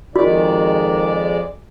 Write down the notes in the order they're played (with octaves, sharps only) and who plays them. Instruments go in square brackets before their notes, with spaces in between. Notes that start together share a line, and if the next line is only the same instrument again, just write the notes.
[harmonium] F2 G#3 D5 [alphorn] D#3 [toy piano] F#4